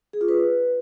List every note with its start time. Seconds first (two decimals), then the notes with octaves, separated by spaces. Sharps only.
0.13 G#4
0.21 F4
0.29 B4